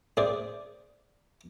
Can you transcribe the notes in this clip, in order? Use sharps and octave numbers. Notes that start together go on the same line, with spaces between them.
A2 G#4 C5 D5